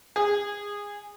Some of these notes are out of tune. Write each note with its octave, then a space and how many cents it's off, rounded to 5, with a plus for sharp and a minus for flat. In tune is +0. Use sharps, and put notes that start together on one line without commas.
G#4 -20